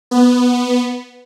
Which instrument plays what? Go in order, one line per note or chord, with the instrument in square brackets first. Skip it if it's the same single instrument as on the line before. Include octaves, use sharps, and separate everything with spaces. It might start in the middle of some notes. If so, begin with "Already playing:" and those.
[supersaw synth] B3